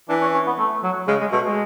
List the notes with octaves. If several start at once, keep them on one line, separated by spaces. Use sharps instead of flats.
E3 D4
C#4
C#4
B3
A3
F#3
C#3 G#3
G#3
B2 A3
G#3